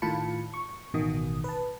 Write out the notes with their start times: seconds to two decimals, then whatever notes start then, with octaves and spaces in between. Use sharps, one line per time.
0.02 A2 D#3 F4 A5 B5 C#7
0.54 C#6
0.94 A1 B2 D#3 D#6
1.44 B4 A5